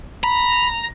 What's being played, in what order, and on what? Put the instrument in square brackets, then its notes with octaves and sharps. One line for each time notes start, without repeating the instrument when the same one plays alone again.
[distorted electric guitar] A#5 [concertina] B5